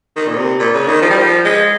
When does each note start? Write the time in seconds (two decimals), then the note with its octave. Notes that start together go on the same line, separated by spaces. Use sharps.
0.16 D#3
0.27 A#2
0.38 C3
0.59 A#2
0.74 C#3
0.88 D#3
1.02 F3
1.10 G3
1.18 F3
1.45 G#3